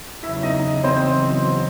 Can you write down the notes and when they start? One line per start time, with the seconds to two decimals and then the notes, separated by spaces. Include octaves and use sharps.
0.23 E2 C#3 F#3 E4 E5
0.43 D#4 D#5
0.84 C4 C5